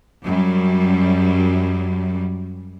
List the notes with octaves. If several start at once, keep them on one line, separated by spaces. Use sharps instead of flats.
F#2 G3